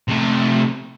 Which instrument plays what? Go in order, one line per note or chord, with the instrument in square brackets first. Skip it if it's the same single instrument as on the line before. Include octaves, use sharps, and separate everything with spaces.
[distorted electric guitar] C3 A3